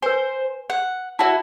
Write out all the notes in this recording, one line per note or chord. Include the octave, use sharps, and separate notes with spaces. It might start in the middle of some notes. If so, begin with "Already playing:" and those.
B4 C5 G#5
F#5
E4 F#4 D5 A5